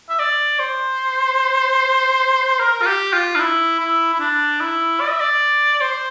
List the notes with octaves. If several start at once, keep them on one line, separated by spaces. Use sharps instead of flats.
E5
D5
C5
A#4
F4
G4
F4
D4
E4
E4
E4
D4
E4
D5
E5
D5
C5